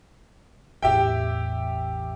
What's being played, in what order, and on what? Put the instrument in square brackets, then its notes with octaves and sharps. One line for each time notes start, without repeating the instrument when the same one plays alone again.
[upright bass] A1 E2 [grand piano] G4 E5 G5